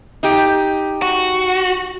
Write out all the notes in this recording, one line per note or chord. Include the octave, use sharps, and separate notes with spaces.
D#4 G4
F#4